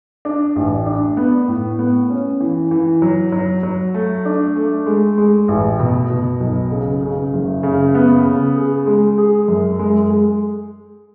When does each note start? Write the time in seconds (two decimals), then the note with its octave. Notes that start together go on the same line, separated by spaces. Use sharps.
0.25 D4
0.56 A1
0.86 D4
1.17 B3
1.48 A2
1.79 B3
2.10 C#4
2.40 E3
2.71 E3
3.02 F#3
3.32 F#3
3.63 F#3
3.94 A3
4.25 D4
4.56 A3
4.86 G#3
5.18 G#3
5.48 A1
5.80 B2
6.10 B2
6.40 B1
6.71 C#3
7.02 C#3
7.33 F#1
7.63 C#3
7.95 B3
8.25 C#3
8.56 G#4
8.87 G#3
9.18 G#4
9.48 F#2
9.79 G#3
10.10 G#3